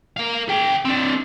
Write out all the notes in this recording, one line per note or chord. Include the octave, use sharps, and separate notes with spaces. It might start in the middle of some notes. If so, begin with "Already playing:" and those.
A#4 F5
G#4 G5
C4 D4